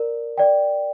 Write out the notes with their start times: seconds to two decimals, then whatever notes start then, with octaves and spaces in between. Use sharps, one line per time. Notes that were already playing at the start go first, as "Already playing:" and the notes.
Already playing: A#4 D5
0.38 D5 G5